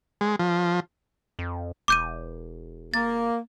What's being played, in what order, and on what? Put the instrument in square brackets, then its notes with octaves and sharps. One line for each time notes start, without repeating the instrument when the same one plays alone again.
[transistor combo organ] G#3
F3
[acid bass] F2
[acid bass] E1 [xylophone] D6 G6 D#7
[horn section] A#3 [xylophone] A6